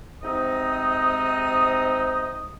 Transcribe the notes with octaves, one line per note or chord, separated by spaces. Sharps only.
G#2 C3 C4 D#4 D#5 D#6